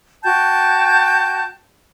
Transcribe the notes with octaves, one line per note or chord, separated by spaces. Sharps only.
F#4 G5 A5 G6